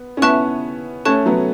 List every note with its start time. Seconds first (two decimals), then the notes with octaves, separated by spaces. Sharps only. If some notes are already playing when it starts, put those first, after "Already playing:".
Already playing: B3
0.17 C#4
0.21 B3 E4 E5 A5 C#6 F#6
1.05 A3 C#4 C#5 A5 C#6 F#6
1.26 F#3 B3